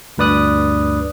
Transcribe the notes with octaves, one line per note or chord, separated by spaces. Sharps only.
D2 G2 B4 D5 D#6 F#6